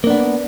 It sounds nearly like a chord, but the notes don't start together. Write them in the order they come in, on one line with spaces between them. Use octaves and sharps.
A#3 D4 B3